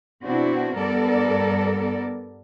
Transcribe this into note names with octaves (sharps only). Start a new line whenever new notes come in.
B2 B3 C4 D4 E4 F#4
G2 G3 B3 A4 A#4 D5